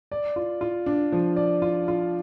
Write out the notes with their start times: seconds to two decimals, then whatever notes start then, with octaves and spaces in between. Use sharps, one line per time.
0.12 D5
0.36 F4
0.61 F4
0.86 D4
1.12 F3
1.36 D5
1.62 F4
1.88 F4